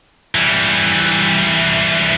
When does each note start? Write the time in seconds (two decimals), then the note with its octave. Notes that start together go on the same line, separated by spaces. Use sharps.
0.35 E3 G3